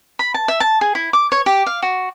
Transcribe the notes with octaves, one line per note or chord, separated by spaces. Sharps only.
B5
A5
E5
A5
G#4
E4
D6
C#5
G4
F5
F#4